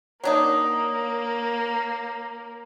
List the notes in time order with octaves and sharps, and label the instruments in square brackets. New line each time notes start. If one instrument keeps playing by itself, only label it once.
[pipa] F#3 D4 D#4 [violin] A#3 [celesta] C#5